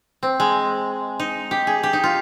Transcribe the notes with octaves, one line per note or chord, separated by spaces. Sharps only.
C4
G#3
D#4
G4
G#4
G4
D#4
F4